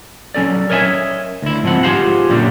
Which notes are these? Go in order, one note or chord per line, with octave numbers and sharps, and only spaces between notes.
F#3 C#4 A4 D5
A#4 C#5 D#5 E5 G#5
D2 E4
G#2 F3 C4 F#5
F4 G4 G#4 C5 F5 F#5
F#2 A#2 D3 F#3 G3